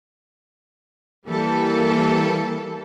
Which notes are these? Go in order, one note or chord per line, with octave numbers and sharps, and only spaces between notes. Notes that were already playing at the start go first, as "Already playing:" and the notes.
E3 G3 A#3 A4